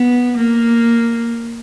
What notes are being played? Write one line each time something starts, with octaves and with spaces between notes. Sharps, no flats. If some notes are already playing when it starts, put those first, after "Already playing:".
Already playing: B3
A#3